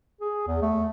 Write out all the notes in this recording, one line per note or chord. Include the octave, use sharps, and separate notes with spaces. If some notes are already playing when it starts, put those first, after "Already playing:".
G#4
E2
A3